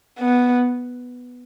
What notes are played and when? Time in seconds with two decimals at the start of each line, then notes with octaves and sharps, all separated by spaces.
0.19 B3